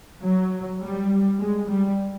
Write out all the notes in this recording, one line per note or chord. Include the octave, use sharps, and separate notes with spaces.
F#3
G3
G#3
G3